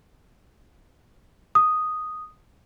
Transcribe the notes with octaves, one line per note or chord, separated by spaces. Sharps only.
D#6